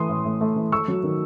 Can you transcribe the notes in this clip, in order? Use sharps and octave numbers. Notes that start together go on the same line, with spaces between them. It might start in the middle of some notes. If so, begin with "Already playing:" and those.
Already playing: E3 A3 C6 D#6
A2
A2
A3
E3
A3 C#6 E6
F#3
D#3